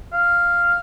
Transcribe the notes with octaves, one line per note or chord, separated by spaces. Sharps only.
F5